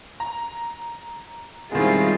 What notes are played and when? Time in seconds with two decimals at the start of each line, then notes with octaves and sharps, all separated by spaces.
0.20 A#5
1.72 D#3 G3 G#3 B3 C4 E4 F4